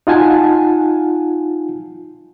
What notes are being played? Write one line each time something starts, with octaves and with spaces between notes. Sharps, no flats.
D#4 F4 F#5 G#5 A5